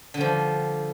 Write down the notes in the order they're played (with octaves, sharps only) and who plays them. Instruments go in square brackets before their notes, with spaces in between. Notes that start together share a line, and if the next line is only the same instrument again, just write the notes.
[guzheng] D3
G3
F3